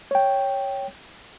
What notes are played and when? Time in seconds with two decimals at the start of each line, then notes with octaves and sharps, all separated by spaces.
0.11 C#5 G5